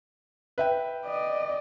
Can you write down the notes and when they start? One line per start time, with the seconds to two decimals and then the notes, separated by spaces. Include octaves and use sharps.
0.58 B4 E5 G5
1.06 D5 D#5